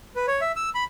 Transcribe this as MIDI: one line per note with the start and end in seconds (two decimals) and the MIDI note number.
0.16 0.26 71
0.28 0.41 73
0.41 0.52 76
0.56 0.70 88
0.75 0.84 83